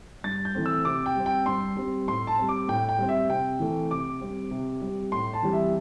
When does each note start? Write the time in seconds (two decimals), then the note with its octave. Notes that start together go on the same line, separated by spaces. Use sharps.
0.24 G2 A6
0.45 G6
0.55 E3 A3 C4
0.66 E6
0.85 C3 D6
1.06 G5
1.16 G3 C4
1.26 G5
1.46 G2 C6
1.77 G3 C4
2.08 A2 C6
2.27 A5
2.38 G3 C4
2.49 D6
2.68 A2 G5
2.89 G5
2.99 G3 C4
3.09 E5
3.29 C3 G5
3.60 E3 A3 C4
3.91 C3 D6
4.21 G3 C4
4.51 C3
4.82 G3 C4
5.12 A2 C6
5.33 A5
5.43 E3 G3 C4
5.53 E5